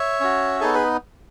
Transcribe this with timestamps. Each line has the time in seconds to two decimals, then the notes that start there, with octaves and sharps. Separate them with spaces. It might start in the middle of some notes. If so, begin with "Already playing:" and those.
Already playing: C#5 E5
0.20 C#4 F#4
0.61 B3 D#4 G#4 A4 C#5
0.74 G#4 B4